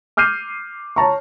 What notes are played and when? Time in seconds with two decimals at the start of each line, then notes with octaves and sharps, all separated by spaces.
0.17 D6 F6 G6 C7 D#7
0.96 C#5 A5 A#5 C#6